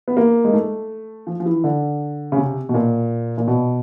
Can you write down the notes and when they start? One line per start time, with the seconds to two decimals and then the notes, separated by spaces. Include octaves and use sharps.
0.08 B3
0.17 A#3
0.45 G#3
0.53 A3
1.27 F3
1.40 F3
1.46 E3
1.64 D3
2.32 C#3
2.37 C3
2.69 B2
2.74 A#2
3.38 A#2
3.47 B2